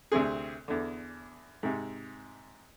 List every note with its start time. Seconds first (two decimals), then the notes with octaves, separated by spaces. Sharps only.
0.12 D2 C3 C4 G#4
0.68 E2 D3
1.63 G#2 C3